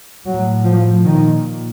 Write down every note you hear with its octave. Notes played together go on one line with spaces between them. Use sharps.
A2 F#3
F3
A#2 D#3